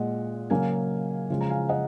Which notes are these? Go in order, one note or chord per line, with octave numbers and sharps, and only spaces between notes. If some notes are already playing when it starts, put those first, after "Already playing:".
Already playing: A#2 G#3 D#5 F#5
C#3 F#3 A#3 F5 G#5
C#3 F3 G#3
A#5
F5 G#5
D#5 F#5